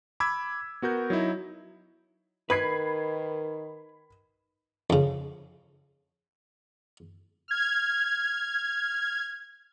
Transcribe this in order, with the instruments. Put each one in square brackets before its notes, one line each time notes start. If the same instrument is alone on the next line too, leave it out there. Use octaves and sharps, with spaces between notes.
[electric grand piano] B5 D6 E6 G#6
B3 F#4 A#4 G6
F#3 D#4 E4
[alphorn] D#3 [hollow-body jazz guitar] B4 [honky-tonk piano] B5 G#6 C7
[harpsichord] F2 C#3
[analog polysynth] F6 G#6